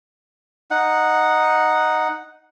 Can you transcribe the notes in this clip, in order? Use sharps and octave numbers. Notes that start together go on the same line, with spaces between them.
D#4 F#5